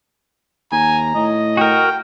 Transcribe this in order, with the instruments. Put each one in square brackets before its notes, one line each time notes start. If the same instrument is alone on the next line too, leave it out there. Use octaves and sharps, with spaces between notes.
[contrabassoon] D#2 [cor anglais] G#5 [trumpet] A#5
[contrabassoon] A2 [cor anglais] D#5
[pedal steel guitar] F#4 A#4 [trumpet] G5